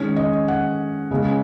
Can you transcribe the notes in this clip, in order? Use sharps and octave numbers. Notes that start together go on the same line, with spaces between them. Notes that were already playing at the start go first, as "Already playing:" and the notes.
Already playing: D#3 G#3 C#4 C#5
D#5
F#5
C#3 G#3 C#4